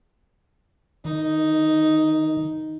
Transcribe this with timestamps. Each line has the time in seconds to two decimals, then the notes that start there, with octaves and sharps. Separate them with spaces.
1.05 D#3 D#4